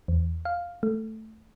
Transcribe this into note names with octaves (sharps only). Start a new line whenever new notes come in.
E2
F5
A3